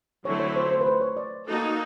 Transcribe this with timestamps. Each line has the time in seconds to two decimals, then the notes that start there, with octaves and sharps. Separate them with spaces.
0.24 D3 F#3 A3 C4 E4 C#5
0.40 C#5
0.56 C5
0.71 C5
0.81 B4
0.86 C5
1.01 C#5
1.17 D5
1.48 A#3 D#4 F#4 A4